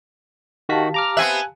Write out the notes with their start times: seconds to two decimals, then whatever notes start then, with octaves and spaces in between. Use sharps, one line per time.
0.69 D#3 F#4 G4 F5 A5 B6
0.94 A#5 D6 F6
1.17 B3 C4 E5 G#5 F#6